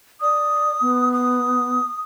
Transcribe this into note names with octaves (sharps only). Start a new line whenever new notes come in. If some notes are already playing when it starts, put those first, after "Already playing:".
D5 D#6
B3
D#6